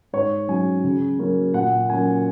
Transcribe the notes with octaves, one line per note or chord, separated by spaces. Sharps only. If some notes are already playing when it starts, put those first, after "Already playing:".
G#2 C#5
F#3 C#4 G#5
C#3
F#3 A#3 C#4
A#2 F#5
F#3 A#3 C#4 G#5